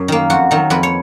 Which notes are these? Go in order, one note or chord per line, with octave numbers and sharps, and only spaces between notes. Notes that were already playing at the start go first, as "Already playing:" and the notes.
Already playing: F#2
D#3 A#3
F2 F#4
D#3 F#3
F2 B4
C#5